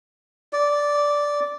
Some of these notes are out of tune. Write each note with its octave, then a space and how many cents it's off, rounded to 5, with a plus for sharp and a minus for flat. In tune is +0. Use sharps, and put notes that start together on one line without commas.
D5 -10